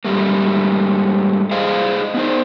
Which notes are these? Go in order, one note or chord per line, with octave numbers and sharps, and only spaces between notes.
G#2 G3 A3 A#3
G#4 C5 D#5 F5
B3 D#4 C5